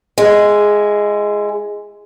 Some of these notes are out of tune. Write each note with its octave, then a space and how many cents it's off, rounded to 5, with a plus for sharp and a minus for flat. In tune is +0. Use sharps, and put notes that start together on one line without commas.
G#3 +0 E4 +30